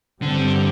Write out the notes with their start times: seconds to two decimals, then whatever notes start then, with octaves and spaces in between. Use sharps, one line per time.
0.22 G2 D3 G3 C4